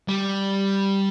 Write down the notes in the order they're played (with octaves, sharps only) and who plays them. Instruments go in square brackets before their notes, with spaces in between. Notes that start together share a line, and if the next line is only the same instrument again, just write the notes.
[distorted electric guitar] G3